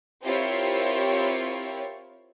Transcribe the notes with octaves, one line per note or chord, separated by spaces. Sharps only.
C4 E4 F4 G4 A#4 C#5